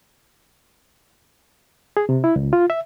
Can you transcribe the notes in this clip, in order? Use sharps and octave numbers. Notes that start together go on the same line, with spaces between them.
G#4
C3
E4
C#2
F4
E5